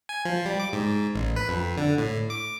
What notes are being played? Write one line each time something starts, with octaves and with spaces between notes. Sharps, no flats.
G#5
F3
G3
D6
G#2
A1
B4
F2
D3
A2
D6